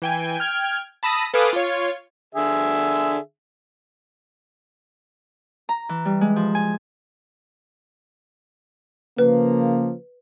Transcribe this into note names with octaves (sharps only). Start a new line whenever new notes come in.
E3 G5 G#5
G5 F6 G#6
A5 B5 D#6 E6 A#6 D#7
A4 B4 F5 G#5 D6 D#6
F4 C#5
D3 G#4 E5
A#5
E3
G3
G#3
F3
G#5
C#3 F3 A#3 B4